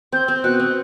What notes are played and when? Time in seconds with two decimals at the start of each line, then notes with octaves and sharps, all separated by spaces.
0.12 C4 G6
0.28 C4
0.44 B2 F#6
0.60 C4